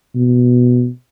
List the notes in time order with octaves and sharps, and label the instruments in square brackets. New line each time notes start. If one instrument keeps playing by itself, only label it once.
[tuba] B2